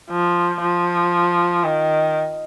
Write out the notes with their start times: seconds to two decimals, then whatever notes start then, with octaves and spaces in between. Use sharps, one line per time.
0.11 F3
0.61 F3
1.64 D#3